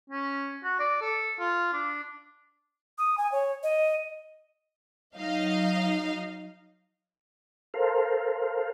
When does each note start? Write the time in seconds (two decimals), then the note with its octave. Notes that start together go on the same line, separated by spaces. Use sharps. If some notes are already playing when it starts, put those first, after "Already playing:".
0.10 C#4
0.64 F#4
0.80 D5
1.02 A4
1.39 F4
1.73 D4
2.98 D#6
3.18 G#5
3.32 C#5
3.63 D#5
5.16 F#3 D#4 D#5 F5
7.74 A4 A#4 C5 F5